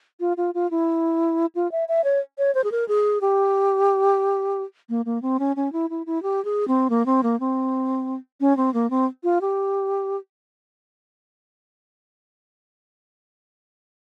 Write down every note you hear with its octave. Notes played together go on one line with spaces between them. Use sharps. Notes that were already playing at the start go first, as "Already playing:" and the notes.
F4
F4
F4
E4
F4
E5
E5
C#5
C#5
C5
G#4
A#4
G#4
G4
A#3
A#3
C4
C#4
C#4
E4
E4
E4
G4
G#4
C4
A#3
C4
A#3
C4
C#4
C4
A#3
C4
F4
G4